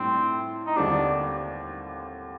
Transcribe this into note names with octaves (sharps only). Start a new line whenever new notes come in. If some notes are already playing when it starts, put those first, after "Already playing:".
Already playing: A2 G3 C4 D4 A4
D#4
D#2 D3 G3 C4 D4 G4